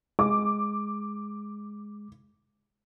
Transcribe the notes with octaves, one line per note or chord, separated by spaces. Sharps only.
G#3 D6